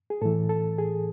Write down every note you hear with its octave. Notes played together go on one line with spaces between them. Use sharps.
G#4
A2 E3 A4
A4
G#4